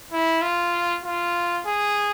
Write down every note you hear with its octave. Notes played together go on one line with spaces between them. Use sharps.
E4
F4
F4
G#4